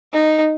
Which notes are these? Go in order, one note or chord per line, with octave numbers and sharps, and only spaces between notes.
D#4